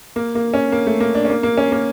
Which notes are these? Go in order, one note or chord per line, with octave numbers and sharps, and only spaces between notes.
A#3
A#3
C#4
A#3
A3
A#3
D4
C#4
A#3
A#3
C#4
A#3